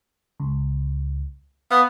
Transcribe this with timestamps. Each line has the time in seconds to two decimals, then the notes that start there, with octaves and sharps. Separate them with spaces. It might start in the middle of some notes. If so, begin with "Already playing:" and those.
0.40 C#2
1.71 B3 F5